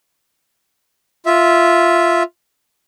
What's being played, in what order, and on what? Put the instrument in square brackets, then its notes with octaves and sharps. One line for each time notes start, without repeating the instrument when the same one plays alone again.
[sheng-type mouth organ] F4 E5